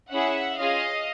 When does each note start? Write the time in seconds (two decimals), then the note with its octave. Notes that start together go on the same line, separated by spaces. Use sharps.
0.12 C#4 E4 G#4 E5 F#5
0.58 C#4 F4 G#4 D#5 F5